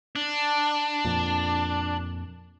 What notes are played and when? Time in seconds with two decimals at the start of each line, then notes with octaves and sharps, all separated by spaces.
0.16 D4
1.05 F2 A#2